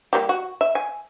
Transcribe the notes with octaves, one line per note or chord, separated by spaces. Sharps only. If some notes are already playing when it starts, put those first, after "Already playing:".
G3 A#3 G4
F#4
E5
G#5